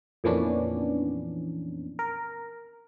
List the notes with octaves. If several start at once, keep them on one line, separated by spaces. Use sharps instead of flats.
F2 A#2 E3 B3 C#4 D4
A#4